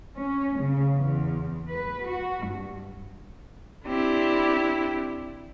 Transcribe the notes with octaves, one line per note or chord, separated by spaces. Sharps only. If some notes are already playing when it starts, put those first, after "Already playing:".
C#4
C#3
E2
B4
F#4
G2
C4 D4 E4 G4